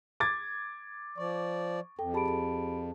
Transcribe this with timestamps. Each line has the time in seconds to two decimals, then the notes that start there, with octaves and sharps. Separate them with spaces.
0.20 D6 G#6 A6
1.18 F3 D5 C#6
1.99 F2 A4 G5
2.14 G4 G#4 A5 B5 D7